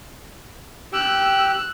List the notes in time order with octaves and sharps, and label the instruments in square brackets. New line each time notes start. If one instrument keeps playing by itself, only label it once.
[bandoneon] G4 G5 [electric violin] E6 F#6